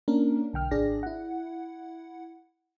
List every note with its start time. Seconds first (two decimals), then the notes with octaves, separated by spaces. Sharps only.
0.08 A#3 C#4 D4 A#4
0.53 B1 D3 G5 F6
0.71 G#1 D4 G#4 D5 A#6
1.03 E4 F#5